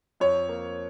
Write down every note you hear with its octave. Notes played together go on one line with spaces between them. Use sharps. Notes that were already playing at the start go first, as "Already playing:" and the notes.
F2 C#5
A#3